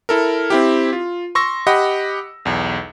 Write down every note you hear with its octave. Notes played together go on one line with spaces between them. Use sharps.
E4 A4 A#4
C4 E4 G4
F4
C6 C#6 E6 A#6
G4 D#5 F#5 B5
B1 E2